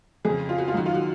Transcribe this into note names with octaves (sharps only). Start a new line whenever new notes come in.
F2 C#3 G#4
F4
F#4
F4
F#2 D#3 F#4
F4
F#4